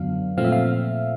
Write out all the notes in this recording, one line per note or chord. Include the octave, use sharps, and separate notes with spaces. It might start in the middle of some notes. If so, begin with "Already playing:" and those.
Already playing: F#2 D3 F#3 B3 D4 F5
A#2 F3 A3 C4 F5
E5
F5